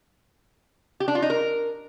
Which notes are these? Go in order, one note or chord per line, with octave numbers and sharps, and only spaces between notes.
G4
D4
F4
D#4
A#4